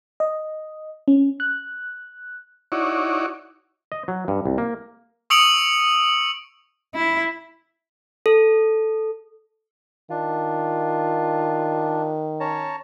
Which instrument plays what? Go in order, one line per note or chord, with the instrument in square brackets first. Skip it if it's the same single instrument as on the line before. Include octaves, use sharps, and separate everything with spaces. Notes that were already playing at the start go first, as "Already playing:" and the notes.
[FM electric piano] D#5
C#4
F#6
[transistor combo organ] D#4 E4 F#4 C#5 D5
[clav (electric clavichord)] D#5
F#3
G2
C2
A#3
[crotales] C#6 D#6 E6 C#7 D7 F#7
[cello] E4
[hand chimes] A4
[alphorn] D#3 [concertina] D4 [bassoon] F4
[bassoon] C#4 [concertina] C#5 A5 A#5